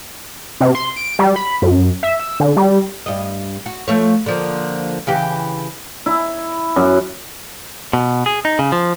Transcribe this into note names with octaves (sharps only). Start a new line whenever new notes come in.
C3
C6
D7
G3
B5
F#2
E5
E6
D3
G3
G2 D#5
F#4
F3 A3 C#5
D3 F3 A#3
C#3 E3 G4
E4
F#2
B2
G#4
D#4
C#3
F3